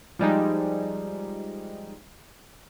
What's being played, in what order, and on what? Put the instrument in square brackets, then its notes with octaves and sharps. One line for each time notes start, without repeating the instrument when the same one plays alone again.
[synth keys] F3 G3 G#3 D#4